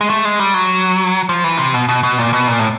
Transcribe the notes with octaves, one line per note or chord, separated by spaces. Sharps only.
G#3
A3
G#3
G3
F#3
F3
E3
C3
B2
B2
B2
A#2
B2
A#2
A2